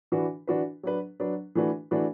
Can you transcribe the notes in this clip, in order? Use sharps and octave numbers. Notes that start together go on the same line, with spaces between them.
E3 D4 F#4 B4
E3 D4 F#4 B4
F#3 D4 B4
F#3 D4 B4
E3 A3 D4 F#4 B4
E3 A3 D4 F#4 B4